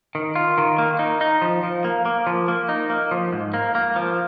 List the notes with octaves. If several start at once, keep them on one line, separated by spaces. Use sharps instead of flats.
D#3
F4
D#3
A#3
D#4
D#4
F3
F3
A#3
A#3
F3
A#3
D#4
A#3
F3
G#2
A#3
A#3
F3